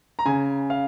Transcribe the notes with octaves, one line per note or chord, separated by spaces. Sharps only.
A#5
C#3 G#5
F5